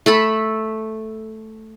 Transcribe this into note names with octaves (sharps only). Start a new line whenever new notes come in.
A3 A4 B5